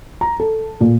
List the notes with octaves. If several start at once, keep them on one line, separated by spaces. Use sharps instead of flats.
A#5
A4
A#2